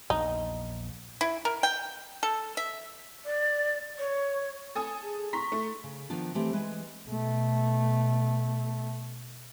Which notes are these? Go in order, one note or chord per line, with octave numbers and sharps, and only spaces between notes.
A#1 E2 D#4
E4
A#4
G5
A4
E5
D5
C#5
A4 G#5 D#6
G#4
A#5 C6 C#6 B6
A3
C#3
D#3 F3 B3 D4 F4
E3 A3 C4 G4
E3 G#3 B4
B2 A3